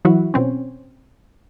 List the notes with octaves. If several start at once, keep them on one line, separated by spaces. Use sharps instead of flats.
E3 F#3 E4 F#4
B2 C4 C#4